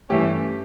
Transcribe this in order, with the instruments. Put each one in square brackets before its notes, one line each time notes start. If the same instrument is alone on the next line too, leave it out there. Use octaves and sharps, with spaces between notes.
[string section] G2 E3 A3 C#4 [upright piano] G4